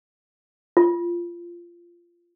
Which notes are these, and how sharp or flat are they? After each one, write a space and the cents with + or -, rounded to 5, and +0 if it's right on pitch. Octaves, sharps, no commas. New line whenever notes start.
F4 -15